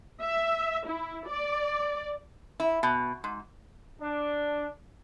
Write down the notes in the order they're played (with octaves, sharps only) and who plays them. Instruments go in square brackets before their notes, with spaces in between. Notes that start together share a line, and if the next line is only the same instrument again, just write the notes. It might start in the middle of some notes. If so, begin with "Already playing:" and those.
[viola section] E5
E4
D5
[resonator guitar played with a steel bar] E4
B2
G#2
[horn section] D4